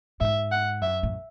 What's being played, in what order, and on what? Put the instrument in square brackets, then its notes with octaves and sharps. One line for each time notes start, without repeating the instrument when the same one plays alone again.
[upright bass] G#2 [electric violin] E5
[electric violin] F#5
[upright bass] F#2 [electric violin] E5
[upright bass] A2